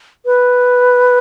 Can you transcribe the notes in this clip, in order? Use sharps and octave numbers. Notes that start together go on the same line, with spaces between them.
B4